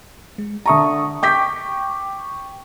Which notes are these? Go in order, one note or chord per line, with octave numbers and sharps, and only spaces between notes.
G#3
D3 E5 A5 A#5 C#6 D#6
G5 C#6 D6 G6 B6